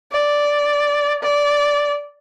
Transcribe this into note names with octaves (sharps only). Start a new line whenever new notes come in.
D5
D5